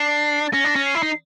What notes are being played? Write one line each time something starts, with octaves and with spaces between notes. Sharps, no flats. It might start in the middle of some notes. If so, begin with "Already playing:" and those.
Already playing: D4 C7
A6
C#4 A#6
D4
C#4
C7
E4
D#4